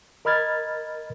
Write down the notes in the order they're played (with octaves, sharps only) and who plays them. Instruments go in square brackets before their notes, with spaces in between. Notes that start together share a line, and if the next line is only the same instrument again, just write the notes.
[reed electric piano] A#4 D#5 B5 F6 G#6 A6